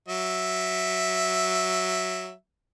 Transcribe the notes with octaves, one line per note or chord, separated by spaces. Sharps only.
F#3 E5